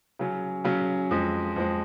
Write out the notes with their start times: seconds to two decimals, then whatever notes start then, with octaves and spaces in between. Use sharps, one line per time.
0.19 C#3 F#3 C#4
0.64 C#3 F#3 C#4
1.11 F2 F3 G#3
1.56 F2 F3 G#3